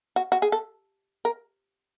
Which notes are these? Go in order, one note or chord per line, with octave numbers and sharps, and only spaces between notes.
F#4
F#4
G#4
A4
A#4